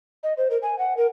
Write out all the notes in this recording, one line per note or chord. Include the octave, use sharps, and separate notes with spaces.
D#5
C5
A#4
G#5
F#5
A#4